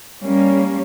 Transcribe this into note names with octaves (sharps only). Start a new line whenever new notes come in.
G3 A#3 C#4